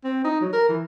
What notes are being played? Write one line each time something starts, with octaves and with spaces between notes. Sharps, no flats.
C4
D#4
F#3
A#4
E3